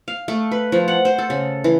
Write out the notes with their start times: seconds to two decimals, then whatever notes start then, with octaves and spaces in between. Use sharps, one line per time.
0.08 F5
0.28 A3
0.51 B4
0.72 F3
0.88 F#5
1.05 C5
1.18 A4
1.30 C#3
1.64 E3